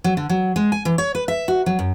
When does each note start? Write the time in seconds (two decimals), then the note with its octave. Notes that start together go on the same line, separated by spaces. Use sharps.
0.04 F#3
0.17 D3
0.30 F#3
0.56 G#3
0.72 G#5
0.85 E3
0.98 C#5
1.15 B4
1.28 E5
1.48 F#4
1.66 F#3
1.79 F#2